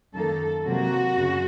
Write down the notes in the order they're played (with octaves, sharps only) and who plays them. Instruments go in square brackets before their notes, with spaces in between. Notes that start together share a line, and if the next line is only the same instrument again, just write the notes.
[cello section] F#2 D#3 A#3 A4
C3 F#3 A#3 F#4
F#2 C#3